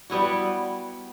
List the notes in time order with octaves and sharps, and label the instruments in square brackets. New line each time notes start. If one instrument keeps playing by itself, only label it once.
[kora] G3 B3 E4 F#4